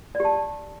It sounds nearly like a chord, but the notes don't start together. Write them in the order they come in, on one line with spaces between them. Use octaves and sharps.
D5 G4 A5